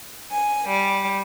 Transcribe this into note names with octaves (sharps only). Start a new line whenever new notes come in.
G#5
G3